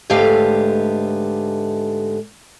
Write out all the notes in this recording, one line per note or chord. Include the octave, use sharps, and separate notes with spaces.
G#2 D3 A3 B3 G4 F5